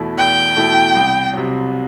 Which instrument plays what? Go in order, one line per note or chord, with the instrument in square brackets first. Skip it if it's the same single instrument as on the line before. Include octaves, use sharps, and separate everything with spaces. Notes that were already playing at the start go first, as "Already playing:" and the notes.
Already playing: [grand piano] E2 B2 A3 E4
[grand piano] E2 [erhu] G5
[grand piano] B2 A3 E4
C2
C3 F#3